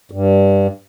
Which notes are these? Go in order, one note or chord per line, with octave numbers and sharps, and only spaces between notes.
G2